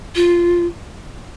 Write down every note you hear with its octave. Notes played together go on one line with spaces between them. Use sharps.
F4